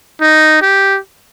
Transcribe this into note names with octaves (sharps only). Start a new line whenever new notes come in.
D#4
G4